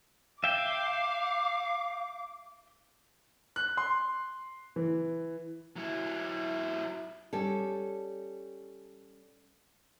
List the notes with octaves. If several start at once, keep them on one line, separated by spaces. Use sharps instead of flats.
E5 F5 G5 D6
F#6
C6
E3
F#3 E4
G3 C#4 A4